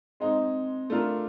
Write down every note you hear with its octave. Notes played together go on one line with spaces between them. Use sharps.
G#3 C4 D#4
A3 D4 F4 A#4